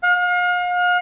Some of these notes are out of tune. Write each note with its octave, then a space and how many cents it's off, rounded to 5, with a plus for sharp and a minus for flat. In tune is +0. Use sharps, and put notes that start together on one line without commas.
F5 +40